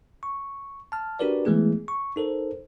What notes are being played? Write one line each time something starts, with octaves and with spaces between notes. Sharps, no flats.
C#6
A5 F6
D4 F#4 G4 A#4 B4 D5
E3 G#3 A3 B3 G#4
C#6
D#4 A4 A#4 C5